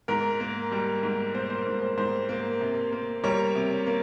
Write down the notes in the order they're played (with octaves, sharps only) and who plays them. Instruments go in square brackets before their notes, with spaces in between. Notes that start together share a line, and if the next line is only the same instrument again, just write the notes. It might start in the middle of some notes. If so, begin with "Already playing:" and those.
[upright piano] G#2 A#4
A#3
G3
G#2
A#3 C5
C5
G#2
C5
G#2 C5
A#3
C3
A#3
G3 A#4 C#5
C3
A#3